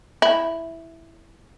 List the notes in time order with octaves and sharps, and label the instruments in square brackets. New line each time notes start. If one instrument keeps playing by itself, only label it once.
[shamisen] E4